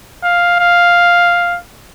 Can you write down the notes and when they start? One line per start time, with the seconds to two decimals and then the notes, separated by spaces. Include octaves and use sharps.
0.23 F5
0.59 F5